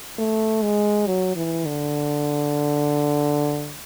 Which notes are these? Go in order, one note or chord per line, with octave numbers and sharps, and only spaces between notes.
A3
G#3
F#3
E3
D3